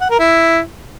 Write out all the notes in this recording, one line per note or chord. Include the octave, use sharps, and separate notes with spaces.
F#5
A#4
E4